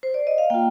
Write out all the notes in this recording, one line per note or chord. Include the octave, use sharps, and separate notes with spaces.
C5
D5
D#5
F5
A#3 F4 G5